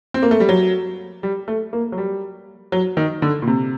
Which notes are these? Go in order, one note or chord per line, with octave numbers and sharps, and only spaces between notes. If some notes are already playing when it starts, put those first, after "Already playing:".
C4
A#3
A3
G3
F#3
G3
A3
A#3
F#3
G3
F#3
D#3
D3
A#2
C3